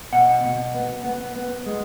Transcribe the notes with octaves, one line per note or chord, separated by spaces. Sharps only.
B2 F#5
B2
B3
B3
B3
G#3